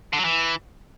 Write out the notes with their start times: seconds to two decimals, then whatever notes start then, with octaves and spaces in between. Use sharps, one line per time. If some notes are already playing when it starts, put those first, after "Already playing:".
0.13 D3
0.19 F#3
0.25 E3